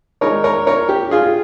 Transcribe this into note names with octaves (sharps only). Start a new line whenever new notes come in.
D#3 G#3 D#4 A#4 C#5
A#4 C#5
A#4 C#5
G4
F4 G#4